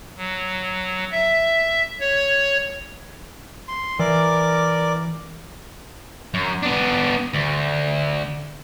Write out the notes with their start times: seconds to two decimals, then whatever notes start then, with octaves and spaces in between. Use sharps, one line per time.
0.17 F#3
1.12 E5
2.00 C#5
3.68 C6
3.99 E3 A#4 D5 D6
6.34 F#2
6.63 B3 D4
7.33 D2